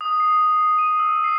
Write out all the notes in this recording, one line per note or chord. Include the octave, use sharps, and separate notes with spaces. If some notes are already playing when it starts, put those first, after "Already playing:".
D#6
C7
D#7
E6
C7